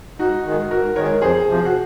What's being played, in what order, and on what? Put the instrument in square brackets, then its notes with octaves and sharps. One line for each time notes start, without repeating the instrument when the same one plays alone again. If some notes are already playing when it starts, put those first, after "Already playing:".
[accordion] G#2 [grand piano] D#4 F#4
[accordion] D#3 G#3
[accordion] G#2 [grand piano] F#4 A#4
[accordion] D#3 G#3 [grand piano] A#4 C#5
[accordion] F2 [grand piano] G#4 C5
[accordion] C3 F3
[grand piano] F#4